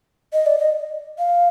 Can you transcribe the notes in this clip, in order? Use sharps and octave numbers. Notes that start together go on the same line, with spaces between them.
D#5
D5
D#5
F5